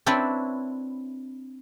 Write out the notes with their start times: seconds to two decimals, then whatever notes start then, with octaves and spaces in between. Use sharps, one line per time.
0.06 C4 D4 E4 B4 C#5 D5